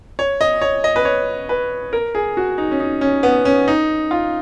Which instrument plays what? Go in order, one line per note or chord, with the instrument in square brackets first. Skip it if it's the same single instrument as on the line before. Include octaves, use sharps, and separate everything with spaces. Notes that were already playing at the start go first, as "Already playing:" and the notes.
[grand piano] C#5
D#5
C#5
D#5
B4
C#5
B4
A#4
G#4
F#4
D#4
C#4
D#4
C#4
B3
C#4
D#4
F4